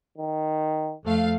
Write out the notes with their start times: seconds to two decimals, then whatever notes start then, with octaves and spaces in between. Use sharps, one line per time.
0.18 D#3
1.05 F2 A3 F5